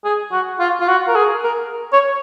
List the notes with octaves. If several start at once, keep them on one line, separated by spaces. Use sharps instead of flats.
G#4
F#4
F4
F4
F#4
A#4
G#4
A#4
C#5